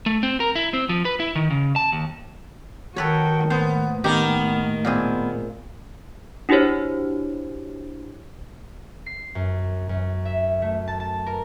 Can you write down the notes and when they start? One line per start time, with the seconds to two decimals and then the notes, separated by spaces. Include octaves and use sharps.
0.06 A3
0.23 C4
0.40 A#4
0.56 E4
0.73 C4
0.89 F3
1.05 B4
1.20 E4
1.35 D#3
1.50 C#3
1.76 A5
1.92 D#2
2.96 D#3 F#4 A4 B4 C#5 G5
3.50 A2 A#3 B3 C5
4.04 D#3 B3 D#4 G4 A#4
4.85 A#2 B3 C4 G#4
6.49 D4 E4 F#4 G4 C5 C#5
9.06 C7
9.35 F#2
9.89 F#2
10.25 E5
10.62 A3
10.88 A5
11.00 A5
11.26 A#4